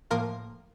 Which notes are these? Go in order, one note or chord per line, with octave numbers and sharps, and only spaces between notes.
A2 F3 A#3 F4 A#4